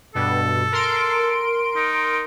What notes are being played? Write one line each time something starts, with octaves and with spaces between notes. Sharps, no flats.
G2 B2 A4
A#4 C6 D7
D#4